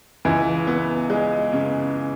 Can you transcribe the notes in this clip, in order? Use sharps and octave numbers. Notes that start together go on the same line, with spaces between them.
C#2 E3
B3
G#3
C#3